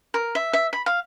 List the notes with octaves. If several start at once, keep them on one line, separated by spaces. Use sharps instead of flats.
A#4
E5
E5
B5
F5